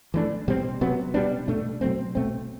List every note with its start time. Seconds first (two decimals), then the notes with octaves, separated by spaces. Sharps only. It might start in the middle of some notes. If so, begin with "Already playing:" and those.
0.14 E3 A3 D4
0.48 B2 G3 C4
0.81 C3 F#3 B3
1.14 B2 G3 B3 D4
1.48 B2 A3 D4
1.81 B2 F#3 A3 C4
2.15 B2 A3 C4